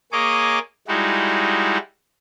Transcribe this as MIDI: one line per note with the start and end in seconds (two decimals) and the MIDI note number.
0.12 0.59 58
0.12 0.59 68
0.12 0.59 73
0.12 0.59 75
0.12 0.59 86
0.88 1.78 55
0.88 1.78 56
0.88 1.78 63
0.88 1.78 64
0.88 1.78 66